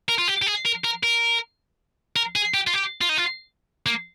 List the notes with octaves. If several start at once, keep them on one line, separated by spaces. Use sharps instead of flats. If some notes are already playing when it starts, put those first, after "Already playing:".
A#4
F4
G4
G4
G#4
A#4
A#4
A#4
A#4
G#4
G4
F4
G4
F4
D#4
F4
A#3